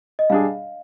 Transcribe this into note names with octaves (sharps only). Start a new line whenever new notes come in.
D#5
G3 D4 G#4 F5